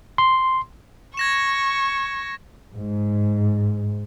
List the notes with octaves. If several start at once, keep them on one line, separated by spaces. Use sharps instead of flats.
C6
C#6 G#6 A#6 E7
G#2